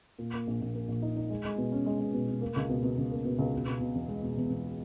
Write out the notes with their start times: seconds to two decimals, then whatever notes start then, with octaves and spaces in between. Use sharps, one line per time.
0.19 A#2
0.34 A#3
0.47 A#1
0.61 A#1
0.75 A#3
0.88 A#1
1.02 D#4
1.16 D#4
1.30 G#3
1.45 G#3
1.58 B2
1.72 C#4
1.86 G#3
2.00 G#3
2.14 B2
2.28 B2
2.41 A#3
2.56 C#2
2.69 B2
2.83 B2
2.98 C#2
3.11 A#3
3.25 B2
3.39 C#2
3.53 B2
3.66 B2
3.81 B2
3.95 E2
4.08 G#3
4.23 B2
4.37 E2
4.50 E2